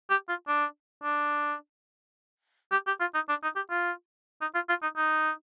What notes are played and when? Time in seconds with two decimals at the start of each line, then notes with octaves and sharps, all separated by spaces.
0.10 G4
0.29 F4
0.48 D4
1.03 D4
2.72 G4
2.87 G4
3.00 F4
3.15 D#4
3.29 D4
3.43 D#4
3.56 G4
3.70 F4
4.41 D#4
4.55 F4
4.69 F4
4.82 D#4
4.97 D#4